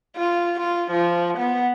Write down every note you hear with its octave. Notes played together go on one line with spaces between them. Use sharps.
F4
F4
F3
B3